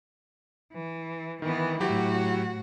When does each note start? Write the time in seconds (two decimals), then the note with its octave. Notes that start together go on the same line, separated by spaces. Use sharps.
0.73 E3
1.42 D#3 E3 B3
1.80 A2 F#3 E4 F#4 G4